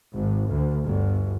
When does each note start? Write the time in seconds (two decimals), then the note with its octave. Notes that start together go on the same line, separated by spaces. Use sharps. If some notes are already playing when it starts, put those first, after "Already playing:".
0.14 G#1
0.50 D2
0.86 G1